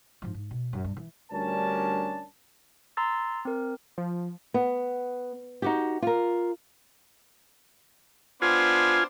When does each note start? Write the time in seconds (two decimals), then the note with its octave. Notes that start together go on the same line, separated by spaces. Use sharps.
0.22 G#2 F3
0.34 G#2
0.51 B2
0.73 F#2
0.84 G2
0.97 E3
1.32 D2 G3 C#4 D4 A#4 A5
2.97 A#5 C6 E6 A6
3.45 C4 A#4
3.98 F3
4.54 B3
5.62 D#4 F#4 G4
6.02 F4 A#4
8.42 B3 D4 F4 C5 G#5